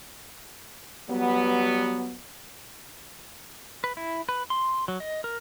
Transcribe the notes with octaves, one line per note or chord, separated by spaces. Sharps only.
F#3 G3 B3
B4
E4
B4
C6
F#3
D#5
A#4